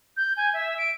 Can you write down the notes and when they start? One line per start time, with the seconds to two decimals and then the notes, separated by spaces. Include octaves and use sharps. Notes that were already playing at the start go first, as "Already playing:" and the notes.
0.17 G6
0.37 G#5
0.54 E5
0.78 D7